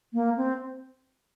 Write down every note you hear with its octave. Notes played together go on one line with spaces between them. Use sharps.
A#3
C4